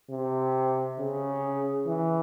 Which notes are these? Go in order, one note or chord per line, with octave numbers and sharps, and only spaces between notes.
C3
C#3
E3